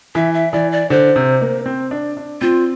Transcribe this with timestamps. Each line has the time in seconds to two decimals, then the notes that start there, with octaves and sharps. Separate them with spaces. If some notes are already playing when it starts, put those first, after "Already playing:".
0.15 E3 E5
0.34 E5
0.53 E3 D5
0.72 D5
0.90 D3 C5
1.16 C3
1.41 A#3
1.66 C4
1.91 D4
2.17 D4
2.41 C4 F4